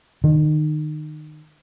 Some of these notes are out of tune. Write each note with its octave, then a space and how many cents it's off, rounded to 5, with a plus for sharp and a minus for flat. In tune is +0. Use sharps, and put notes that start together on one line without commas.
D#3 -30